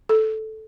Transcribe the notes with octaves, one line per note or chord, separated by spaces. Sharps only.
A4